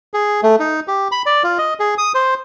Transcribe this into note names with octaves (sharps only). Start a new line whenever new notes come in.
G#4
A3
D#4
G4
B5
D5
F4
D#5
G#4
D#6
C5